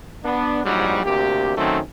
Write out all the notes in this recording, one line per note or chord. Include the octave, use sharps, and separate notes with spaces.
B3 D4
A#1 G#2 F#3 G3
D2 C3 A#3 G4
D#3 F#3 A3 C4 C#4